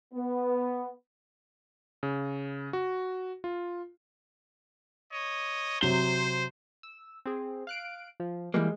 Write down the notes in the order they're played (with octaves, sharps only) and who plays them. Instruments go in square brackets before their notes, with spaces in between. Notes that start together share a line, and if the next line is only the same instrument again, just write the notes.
[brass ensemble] B3
[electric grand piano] C#3
F#4
F4
[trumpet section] C#5 D#5
[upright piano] C3 F#3 G7 [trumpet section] C5
[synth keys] E6
C4 G#4
F5 F#6 D7
F3
[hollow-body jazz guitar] E3 G3 A#3 [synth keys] G#3